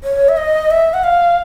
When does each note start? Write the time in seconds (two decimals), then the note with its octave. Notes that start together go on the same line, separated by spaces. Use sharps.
0.03 C#5
0.29 E5
0.37 D#5
0.71 E5
0.94 F#5
1.04 F5